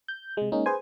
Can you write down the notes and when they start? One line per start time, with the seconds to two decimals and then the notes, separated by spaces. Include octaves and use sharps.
0.08 G6
0.37 C3 G#3
0.52 G#3 A#3 C#4 D#4
0.66 G#4 B4 C5 G#5